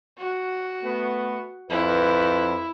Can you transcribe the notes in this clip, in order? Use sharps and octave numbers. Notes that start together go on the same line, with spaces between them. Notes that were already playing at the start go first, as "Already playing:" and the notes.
F#4
A3 B3
F2 E4 B4